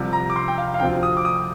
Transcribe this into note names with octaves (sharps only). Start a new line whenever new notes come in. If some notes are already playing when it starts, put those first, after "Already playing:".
Already playing: C2 C3 F3
A#5
D6
C6
G5
F5
F5
D2 C3 F3 C4 F4 G5
D#6
D6
D#6